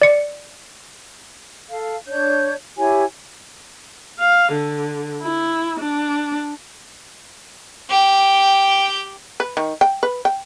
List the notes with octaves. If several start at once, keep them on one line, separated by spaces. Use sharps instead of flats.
D5 C#7
A4 F5
D4 C#5 G6
E4 G4 C#5 G#5
F5
D3
E4
D4
G4 G5
B4
D#3
G5
B4
G5